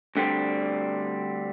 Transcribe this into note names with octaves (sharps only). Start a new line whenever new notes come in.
D2 D3 G3 C4